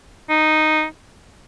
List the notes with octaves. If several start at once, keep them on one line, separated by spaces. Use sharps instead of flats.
D#4